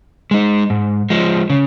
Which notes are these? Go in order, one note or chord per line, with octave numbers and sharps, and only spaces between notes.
G#3 D#4
G#2
F3 G#3
C#3